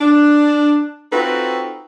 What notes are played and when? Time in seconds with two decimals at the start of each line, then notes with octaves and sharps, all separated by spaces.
0.01 D4
1.12 C4 D#4 F4 F#4 A4 B4